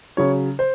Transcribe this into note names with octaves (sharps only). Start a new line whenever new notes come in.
C#3 F#3 C#5
C5